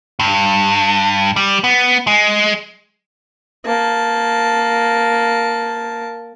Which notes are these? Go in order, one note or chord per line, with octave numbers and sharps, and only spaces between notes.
G2
G3
B3
G#3
A#3 A5